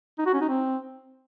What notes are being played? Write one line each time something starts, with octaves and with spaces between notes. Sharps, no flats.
D#4
F#4
C#4
D#4
C4